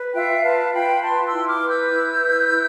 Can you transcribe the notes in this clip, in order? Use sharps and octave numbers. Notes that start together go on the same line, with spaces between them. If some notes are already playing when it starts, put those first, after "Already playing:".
Already playing: B4
F4 E5 G5
B4 F5 A5
F4 G5 B5
B4 A5 C6
C6 E6
E4
D6 F6
B4
E6 G6
E4
B4
E4